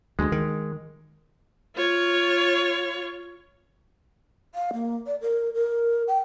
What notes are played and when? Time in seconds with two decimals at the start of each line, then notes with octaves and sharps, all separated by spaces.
0.19 D2 G#3
0.32 D#3
1.76 F4 C#5
4.55 F5
4.73 A#3
5.06 D5
5.21 A#4
5.54 A#4
6.08 G5